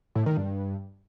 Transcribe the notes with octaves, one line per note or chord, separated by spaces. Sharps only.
A2
D#3
G2